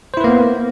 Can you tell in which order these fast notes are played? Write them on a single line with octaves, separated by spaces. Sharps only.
C5 E4 B4 A#3 B3